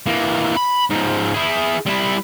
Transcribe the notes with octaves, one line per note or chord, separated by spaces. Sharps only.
E3 A#3
B5
G#2 F3
E4 G#4
G3 E4